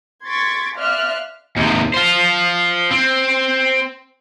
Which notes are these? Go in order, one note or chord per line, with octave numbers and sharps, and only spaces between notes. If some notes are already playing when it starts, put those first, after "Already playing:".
C6 C#6 G#6 A6 B6 D7
D5 E5 F5 C6 F6 F#6
D#2 C3
F4 C5
C4